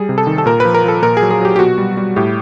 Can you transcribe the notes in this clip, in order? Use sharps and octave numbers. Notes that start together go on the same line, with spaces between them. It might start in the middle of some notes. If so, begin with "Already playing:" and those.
Already playing: G3 G#4
C3
A4
D#3
A4
A#2 A#4
B4
F3
A#4
F3 A4
A#2 A#4
G#4
F#3
G#4
F#3 G4
G4
B2 F#4
G3
G3
A2 G4